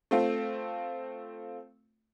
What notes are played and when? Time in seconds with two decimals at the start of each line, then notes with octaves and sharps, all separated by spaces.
0.11 A3 C4 F4